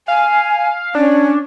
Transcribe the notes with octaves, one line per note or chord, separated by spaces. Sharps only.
F5 G#5
C#4 D4